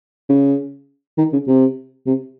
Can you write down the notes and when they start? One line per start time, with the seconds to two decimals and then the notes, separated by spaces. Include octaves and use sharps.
0.29 C#3
1.18 D#3
1.32 C#3
1.47 C3
2.07 C3